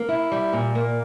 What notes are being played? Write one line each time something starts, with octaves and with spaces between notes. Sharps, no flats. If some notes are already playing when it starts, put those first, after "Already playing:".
Already playing: A#3
E4
G3
A#2
A#3